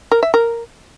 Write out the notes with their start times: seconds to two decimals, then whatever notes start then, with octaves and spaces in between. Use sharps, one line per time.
0.12 A#4
0.23 E5
0.34 A#4